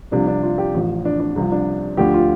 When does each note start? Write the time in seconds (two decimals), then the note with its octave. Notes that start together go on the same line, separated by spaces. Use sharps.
0.11 C2 C3 F3 D4
0.27 D4
0.43 F4
0.58 G4
0.74 A1 A2 F3
1.05 D4
1.20 D4
1.36 C2 C3 F3
1.52 D4
1.97 D2 D3 F3 G4
2.14 F4